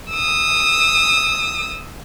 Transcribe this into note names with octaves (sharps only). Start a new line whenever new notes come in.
D#6 E6